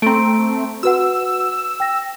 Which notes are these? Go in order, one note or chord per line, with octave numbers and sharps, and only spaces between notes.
A3 C4 A#5 D7
F#4 B4 F#5 E6
G5 A#6